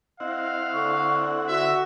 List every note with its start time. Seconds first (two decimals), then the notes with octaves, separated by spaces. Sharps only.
0.20 C4 E4 D#5 F5 F#5
0.73 D3 C#6
1.48 F#4 E5